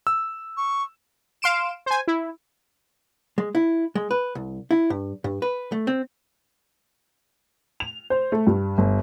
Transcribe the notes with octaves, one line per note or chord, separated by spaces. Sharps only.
E6
C#6
F5 C6 D7 E7
C5 G#5
E4
G#3
E4
G#3
B4
C2
E4
G2
G2
B4
A3
C4
F7
C5
A3
G2
G1